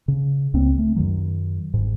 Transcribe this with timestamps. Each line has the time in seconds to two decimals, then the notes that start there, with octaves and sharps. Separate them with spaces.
0.08 C#3
0.54 C#2 C#3 A#3 C4
0.78 A3
0.96 F#2 D#3 F#3
1.74 G1 G#2